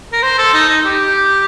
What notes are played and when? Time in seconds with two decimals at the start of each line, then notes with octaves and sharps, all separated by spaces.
0.13 A#4
0.23 C5
0.38 A4
0.54 D#4
0.69 D#4
0.85 G4